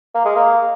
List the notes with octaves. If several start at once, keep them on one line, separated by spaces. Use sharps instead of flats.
A#3
G#3
A#3